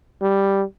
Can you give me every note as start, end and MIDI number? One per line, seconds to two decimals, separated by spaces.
0.22 0.63 55